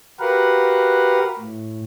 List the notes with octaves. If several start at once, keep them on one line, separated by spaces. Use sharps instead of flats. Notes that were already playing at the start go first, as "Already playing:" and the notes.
F#4 G4 A#4 B4 F5 F#5
A2